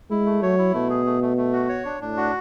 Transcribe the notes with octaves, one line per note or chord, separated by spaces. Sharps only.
G#3 E4
A3
F#3 C#5
E4
B2 A3
G#4
A3
A3
A3
F#4
C#5
D4
A2 D4
F#4